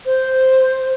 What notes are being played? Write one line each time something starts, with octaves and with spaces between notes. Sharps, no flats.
C5